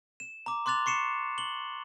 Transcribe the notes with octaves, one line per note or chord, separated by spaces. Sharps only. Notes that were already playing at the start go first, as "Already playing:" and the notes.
E7
A#5 D6
C6 D6 F#6 A6 F7
C#6 C7 C#7 E7
F#7 G7